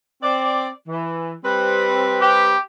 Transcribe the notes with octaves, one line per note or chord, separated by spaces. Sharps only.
C4 D5
E3
G3 C4 B4
G4